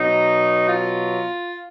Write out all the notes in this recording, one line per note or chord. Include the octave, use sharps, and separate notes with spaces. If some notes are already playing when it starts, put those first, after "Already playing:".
Already playing: B2 F#3 D#4
F4